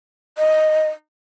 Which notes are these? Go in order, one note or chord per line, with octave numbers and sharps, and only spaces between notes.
D#5